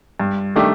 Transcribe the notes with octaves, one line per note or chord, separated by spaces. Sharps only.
G2
D#3 A3 D4 G4